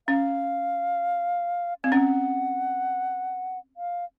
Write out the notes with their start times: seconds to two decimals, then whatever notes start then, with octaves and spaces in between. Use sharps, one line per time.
0.08 C#4 F5
1.84 C4 F5
1.92 C#4 F#5
3.77 F5